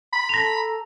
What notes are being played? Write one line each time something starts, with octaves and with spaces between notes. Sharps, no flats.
B5
A4 A5 A#5 A#6 F7